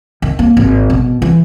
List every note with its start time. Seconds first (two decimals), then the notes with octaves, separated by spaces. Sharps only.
0.22 D#3
0.39 A#3
0.57 G#1
0.90 B2
1.22 E3